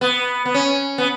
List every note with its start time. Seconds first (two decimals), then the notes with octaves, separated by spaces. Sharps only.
0.01 B3
0.45 B3
0.54 C#4
0.98 B3